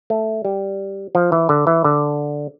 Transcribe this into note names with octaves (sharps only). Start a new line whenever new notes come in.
A3
G3
F3
E3
D3
E3
D3